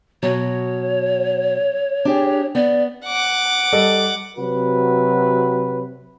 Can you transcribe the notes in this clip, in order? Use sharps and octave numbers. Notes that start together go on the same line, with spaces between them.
B2 F#3 C#5
D4 G4 G#4
B3 D5
F#5 D6
G3 A4 D#5
C3 F#3 F#4 B4